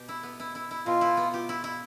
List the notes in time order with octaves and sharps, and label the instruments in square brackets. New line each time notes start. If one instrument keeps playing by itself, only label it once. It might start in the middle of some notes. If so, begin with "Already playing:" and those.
Already playing: [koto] B2 G4
E4
B3
E4
E4
E4
[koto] B2 [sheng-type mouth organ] F4
[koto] E4
B3
G4
E4
E4